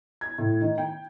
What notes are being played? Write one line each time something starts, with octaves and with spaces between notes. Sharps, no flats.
G#6
A2
D#3
G5